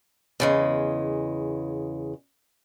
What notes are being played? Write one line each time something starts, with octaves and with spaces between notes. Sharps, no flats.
E2 C#3 G#3